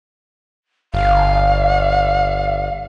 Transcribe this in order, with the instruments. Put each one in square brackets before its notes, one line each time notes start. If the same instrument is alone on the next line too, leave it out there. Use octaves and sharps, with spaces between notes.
[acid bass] G1 [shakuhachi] F5